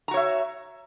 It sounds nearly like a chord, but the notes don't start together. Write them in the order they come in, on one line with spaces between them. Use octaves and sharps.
A#5 F#4 C#5 E5